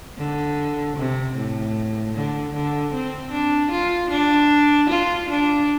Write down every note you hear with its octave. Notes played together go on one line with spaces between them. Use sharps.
D3
C3
A2
D3
D3
C4
D4
F4
D4
F4
D4